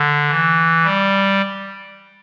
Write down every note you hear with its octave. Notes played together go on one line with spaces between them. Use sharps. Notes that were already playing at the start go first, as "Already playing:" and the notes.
Already playing: D3
E3
G3